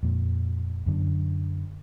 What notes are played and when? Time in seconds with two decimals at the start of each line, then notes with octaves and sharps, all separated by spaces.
0.03 F2 A#2
0.86 F#2 D3